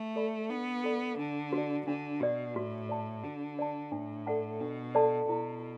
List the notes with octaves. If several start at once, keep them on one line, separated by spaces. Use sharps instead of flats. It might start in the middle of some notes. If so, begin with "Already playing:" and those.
Already playing: A3
A4 D5 B5
B3 D4
A4 D5 B5
D3 D4
F#4
D5
D3 D4
B2 F#4 D5
A2 F#4
D5 A5
D3 F#4
D5 A5
A2 D4
A4 D5 F#5 A5
B2 D4
A4 D5 F#5 A5
B2 E4